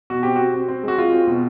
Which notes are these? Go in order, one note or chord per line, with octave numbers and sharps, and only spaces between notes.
B2 F#4
C4 G4
C4 F#4
C4
C4
G#3 F#4
G#3 F4
C4
B2